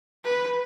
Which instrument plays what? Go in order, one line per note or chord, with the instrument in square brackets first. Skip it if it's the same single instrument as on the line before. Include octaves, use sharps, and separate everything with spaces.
[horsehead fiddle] B4